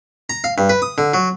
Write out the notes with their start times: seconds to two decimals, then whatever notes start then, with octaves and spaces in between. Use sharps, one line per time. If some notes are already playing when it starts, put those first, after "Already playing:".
0.30 A#5
0.44 F5
0.58 G2
0.69 B4
0.82 D#6
0.98 D3
1.14 F#3